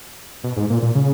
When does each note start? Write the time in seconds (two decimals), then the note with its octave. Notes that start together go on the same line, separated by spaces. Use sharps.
0.44 B2
0.56 G#2
0.70 A#2
0.82 A#2
0.95 C#3